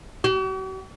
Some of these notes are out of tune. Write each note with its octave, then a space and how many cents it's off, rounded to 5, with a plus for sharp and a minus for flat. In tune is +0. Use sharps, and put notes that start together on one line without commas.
F#4 +45